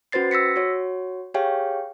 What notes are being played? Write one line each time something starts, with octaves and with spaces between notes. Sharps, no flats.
C#4 F#4 B4 C5 A6 C7
E6 A#6 B6 C#7
F#4 C#5
G4 G#4 C#5 F5 G5